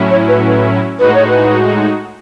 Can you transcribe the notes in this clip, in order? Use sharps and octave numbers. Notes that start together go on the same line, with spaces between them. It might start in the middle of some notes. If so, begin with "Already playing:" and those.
Already playing: A2 F#3 C#4 E4
C#5
B4
B4
A2 G#3 D#4 F#4 B4
C#5
B4